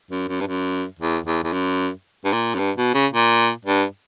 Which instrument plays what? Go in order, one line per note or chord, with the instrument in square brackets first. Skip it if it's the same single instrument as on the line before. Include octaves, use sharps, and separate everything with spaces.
[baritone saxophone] F#2
F#2
G2
F#2
E2
E2
E2
F#2
G2
A#2
F#2
G2
B2
C#3
A#2
G2